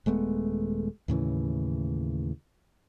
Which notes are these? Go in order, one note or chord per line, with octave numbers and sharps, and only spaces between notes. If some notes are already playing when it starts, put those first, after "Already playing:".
D#1 G#3 A3 B3
D#2 A2 C#3 E3